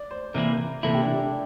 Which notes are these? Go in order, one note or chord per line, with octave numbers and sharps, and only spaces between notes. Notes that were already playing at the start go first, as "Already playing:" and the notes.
Already playing: D5
C5
C3 E3 A#3 E4 A#4
C3 E3 A#3 E4 A4
G4
D4
E4
D4